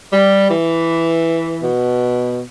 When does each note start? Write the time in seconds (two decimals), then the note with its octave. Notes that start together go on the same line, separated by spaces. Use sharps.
0.12 G3
0.50 E3
1.62 B2